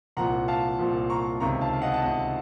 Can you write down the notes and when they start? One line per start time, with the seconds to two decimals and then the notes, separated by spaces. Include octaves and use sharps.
0.17 C2 A#2 F3 F#5 A#5
0.48 F5 A5
0.79 C2 A#2 F3
1.10 A#5 C#6
1.40 C#2 C3 D#3 A#5 C#6
1.61 F5 A5
1.73 F5
1.82 D#5 F#5
1.94 A5
2.03 C#2 C3 D#3 D#5 F#5